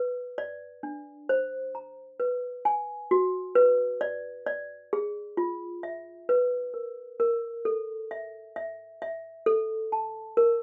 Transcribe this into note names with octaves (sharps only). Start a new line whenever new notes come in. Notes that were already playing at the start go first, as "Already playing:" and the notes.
Already playing: B4
D5
D4
C5
A#5
B4
G#5
F#4
B4
D5
D5
G#4
F4
E5
B4
A#4
A#4
A4
E5
E5
E5
A4
A5
A#4